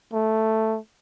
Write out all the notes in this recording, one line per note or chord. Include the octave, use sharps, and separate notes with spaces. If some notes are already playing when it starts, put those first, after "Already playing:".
A3